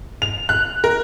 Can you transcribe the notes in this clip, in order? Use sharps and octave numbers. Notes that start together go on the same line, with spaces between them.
F7
F#6
A#4